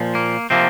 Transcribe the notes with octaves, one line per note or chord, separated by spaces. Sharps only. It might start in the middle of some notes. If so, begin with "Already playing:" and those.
Already playing: A#2 F3
A#3
C3 F3 A#3 C4